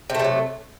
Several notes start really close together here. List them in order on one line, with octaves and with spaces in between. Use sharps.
C3 A3 G3 F#3